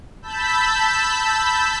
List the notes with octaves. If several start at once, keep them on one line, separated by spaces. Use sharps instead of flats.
A5 B5 E6 G6 B6